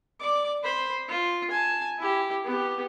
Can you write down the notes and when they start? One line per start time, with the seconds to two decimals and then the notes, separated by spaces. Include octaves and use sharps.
0.20 D5 D6
0.63 C5 B5
1.09 F4
1.51 G#5 A5
1.99 E4 G4
2.44 B3 G4